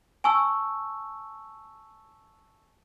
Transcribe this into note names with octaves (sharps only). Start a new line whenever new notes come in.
G#5 A5 C#6 E6